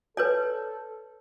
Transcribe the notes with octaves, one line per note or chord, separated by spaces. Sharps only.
A4 B4 C#5 D5